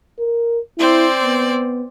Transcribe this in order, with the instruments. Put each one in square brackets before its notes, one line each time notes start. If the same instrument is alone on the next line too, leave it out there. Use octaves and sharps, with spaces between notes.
[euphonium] A#4
[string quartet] C4 C5 D5 [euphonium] E4
[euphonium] B3